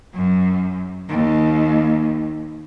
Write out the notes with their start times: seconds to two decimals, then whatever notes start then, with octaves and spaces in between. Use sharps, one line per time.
0.14 F#2
1.09 D#2